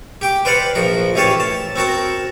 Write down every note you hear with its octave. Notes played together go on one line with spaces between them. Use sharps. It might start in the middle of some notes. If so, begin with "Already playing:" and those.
G4 G5 D6
B4 C5 D5 F5 F#5 B5
A#1 F3 A#4
A1 E3 G4 C#5 F5 A5
A5
C4 F#4 A#4 A5